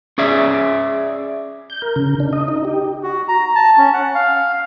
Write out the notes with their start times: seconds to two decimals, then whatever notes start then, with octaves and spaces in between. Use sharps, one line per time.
0.18 C#4 G#4 D5 E5
1.70 G6
1.82 A#4
1.96 C#3
2.20 D4
2.33 D#5
2.48 D#4
2.65 G4
3.03 F#4
3.28 A#5
3.55 A5
3.78 C#4
3.94 F#5
4.15 F5